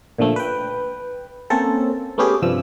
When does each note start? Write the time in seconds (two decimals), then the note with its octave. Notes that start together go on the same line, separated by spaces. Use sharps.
0.18 A#2 D3 F3 A3
0.36 B4 G5
1.50 A#3 C4 C#4 A4
2.18 A3 B3 C#4 G4 G#4
2.42 G2 C3 F3 E6